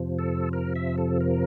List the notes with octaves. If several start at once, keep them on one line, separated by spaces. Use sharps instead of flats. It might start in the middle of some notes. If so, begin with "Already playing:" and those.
Already playing: F2 C3 F3
A4
A#4
E5
A4
A#4